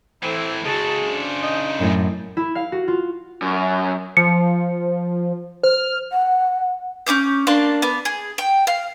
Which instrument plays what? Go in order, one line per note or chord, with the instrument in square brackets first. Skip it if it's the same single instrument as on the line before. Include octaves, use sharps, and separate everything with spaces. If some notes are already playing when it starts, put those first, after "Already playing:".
[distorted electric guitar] A2 E3 [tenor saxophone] C4 [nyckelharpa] E4 A4
[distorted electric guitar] C#3 A4 [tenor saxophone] G#3 [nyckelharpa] F#4 A5
[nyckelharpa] D4 C5
[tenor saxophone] D#4
[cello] F#2 A2
[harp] E4
F5
F#4
F4
[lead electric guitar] F#2
[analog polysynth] F3 [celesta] C#7
[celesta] C5 [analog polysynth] F6
[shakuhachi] F#5
[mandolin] C#4 G#4 D6 G6
A#3 D4 A5 C6
B3 D6
G#4
G5
F5